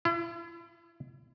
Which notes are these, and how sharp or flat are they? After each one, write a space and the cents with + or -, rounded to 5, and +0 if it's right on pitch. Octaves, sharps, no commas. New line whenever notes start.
E4 +40